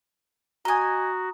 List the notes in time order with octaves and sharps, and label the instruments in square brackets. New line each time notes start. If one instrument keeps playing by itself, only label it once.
[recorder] F#4 [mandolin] D#5 G#5 [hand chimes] A#5 D#6